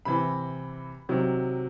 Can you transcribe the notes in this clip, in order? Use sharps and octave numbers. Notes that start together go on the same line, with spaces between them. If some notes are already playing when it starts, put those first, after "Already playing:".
C3 E3 B5
C3 D#3 F#3